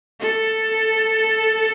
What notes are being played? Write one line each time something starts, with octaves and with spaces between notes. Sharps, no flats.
A4